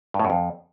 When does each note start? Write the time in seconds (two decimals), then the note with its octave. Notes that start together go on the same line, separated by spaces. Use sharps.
0.14 G2
0.20 A2
0.25 F#2
0.30 F2